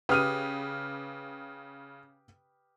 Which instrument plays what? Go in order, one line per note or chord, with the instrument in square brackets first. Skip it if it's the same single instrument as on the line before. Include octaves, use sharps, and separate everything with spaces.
[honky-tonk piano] C#3 [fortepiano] G4 B4 G5 [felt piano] D#6 F6 D#7